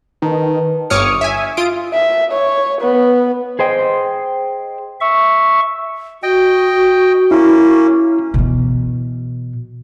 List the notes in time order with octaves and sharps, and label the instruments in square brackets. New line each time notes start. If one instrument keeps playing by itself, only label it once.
[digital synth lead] D#3 [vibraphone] B4 A5
[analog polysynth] G1 C#5 D6 D#6 F6 C#7
E5 G#5
F4 D#6 D7
[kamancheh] E5
C#5
B3
[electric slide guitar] G#4 C5 D#5 G5
[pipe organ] E5 C#6
[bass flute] F#4 [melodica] D#5 G5
[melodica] A#3 C#4 [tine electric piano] E4
[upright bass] B2 E3